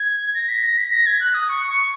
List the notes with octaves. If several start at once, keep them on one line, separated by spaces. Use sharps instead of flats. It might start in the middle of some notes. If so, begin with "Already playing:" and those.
Already playing: G#6
A#6
B6
A#6
B6
A#6
G#6
F#6
D#6
C#6
C#6